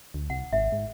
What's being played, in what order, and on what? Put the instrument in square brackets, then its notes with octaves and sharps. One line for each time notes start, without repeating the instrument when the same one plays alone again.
[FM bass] D2
[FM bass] C2 [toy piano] F#5
[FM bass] G#1 [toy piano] E5
[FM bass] G#2